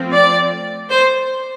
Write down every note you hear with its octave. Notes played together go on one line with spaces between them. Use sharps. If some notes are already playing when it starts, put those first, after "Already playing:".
Already playing: F3 A3 C4
D5
C5